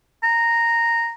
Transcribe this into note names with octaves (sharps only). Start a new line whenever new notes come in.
A#5